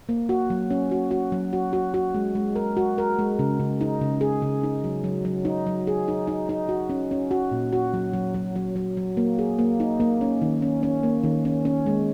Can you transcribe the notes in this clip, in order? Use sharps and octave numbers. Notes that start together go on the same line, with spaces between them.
A#3
F#4
F#3
C#4
F#4
F#4
F#3
F#4
F#4
F#4
G#3
G#3
A#4
F#4
A#4
G#3
C#3
C#3
D#4
C#3
G#4
C#3
D#4
F#3
F#3
F#3
D#4
F#3
G#4
D#4
D#4
D#4
F#4
C#4
C#4
F#4
A#2
F#4
F#3
F#3
F#3
F#3
F#3
F#3
A#3
G#4
A#3
D#4
A#3
C#4
D#3
C#4
C#4
A#3
D#3
C#4
C#4
G#3